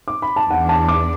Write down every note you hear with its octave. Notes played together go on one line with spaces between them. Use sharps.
D6
B5
A5
E2 E3 D4 F#5
A5
D6